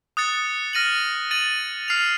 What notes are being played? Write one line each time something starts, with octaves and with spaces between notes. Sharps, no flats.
D#6 F#6 A6 C#7
F6 A#6 D#7 F#7
A6 D#7 F#7
F6 C7 F7